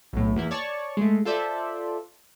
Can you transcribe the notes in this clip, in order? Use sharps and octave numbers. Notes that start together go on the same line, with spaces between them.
B1 A2
E2 A#3 E4
C#5 D5 A5 C#6
G#3 A3
F4 A4 C5 D5 E5